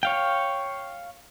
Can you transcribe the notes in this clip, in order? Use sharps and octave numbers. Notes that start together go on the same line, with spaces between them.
C#5 F5 G5